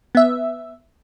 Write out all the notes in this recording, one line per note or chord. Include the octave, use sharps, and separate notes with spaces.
B3 E5